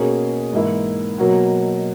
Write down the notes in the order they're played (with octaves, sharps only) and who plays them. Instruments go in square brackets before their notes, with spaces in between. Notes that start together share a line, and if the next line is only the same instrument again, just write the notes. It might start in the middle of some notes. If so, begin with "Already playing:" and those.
Already playing: [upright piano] B2 A#3 C#4 G#4
G#2 E3 A#3 E4
B2 F#3 A#3